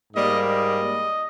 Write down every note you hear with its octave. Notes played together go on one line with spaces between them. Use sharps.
G#2 G3 A#3 D#5
D#5